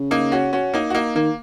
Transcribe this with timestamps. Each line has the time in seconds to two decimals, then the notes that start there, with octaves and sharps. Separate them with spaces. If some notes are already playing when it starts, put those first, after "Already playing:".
Already playing: C#3
0.11 A#3 D#4
0.32 C#4 F#4
0.53 C#4 F#4
0.74 A#3 D#4
0.90 F#4
0.95 A#3 D#4
1.16 D#3 A#3